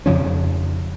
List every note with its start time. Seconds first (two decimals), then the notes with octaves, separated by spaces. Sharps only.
0.06 F2 C#3 F3 C#4